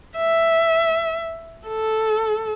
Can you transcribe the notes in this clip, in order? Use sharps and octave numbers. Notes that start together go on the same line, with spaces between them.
E5
A4